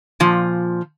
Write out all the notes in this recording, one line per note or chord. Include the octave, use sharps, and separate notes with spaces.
A#2 F3